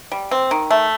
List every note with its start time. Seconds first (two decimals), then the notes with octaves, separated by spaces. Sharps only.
0.12 G3
0.31 C4
0.51 D#3
0.71 A3